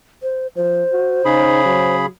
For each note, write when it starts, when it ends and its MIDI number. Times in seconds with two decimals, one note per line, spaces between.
0.23 0.47 72
0.56 0.83 53
0.56 1.96 72
0.92 1.22 66
1.25 2.06 49
1.25 1.62 63
1.25 2.06 68
1.25 2.06 83
1.65 2.08 54